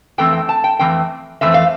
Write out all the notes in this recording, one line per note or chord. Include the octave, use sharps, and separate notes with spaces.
F2 E3 A3 C4 G5
G5
A5
G5
F2 E3 A3 C4 G5
F2 E3 A3 C4 E5
F5